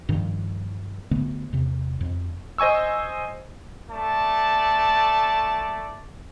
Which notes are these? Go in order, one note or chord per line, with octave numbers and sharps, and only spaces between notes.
G2 D#3 F3
D2 D3 A3 B3
E2 C3
F2
C5 D#5 G#5 C#6 E6
A3 D5 A5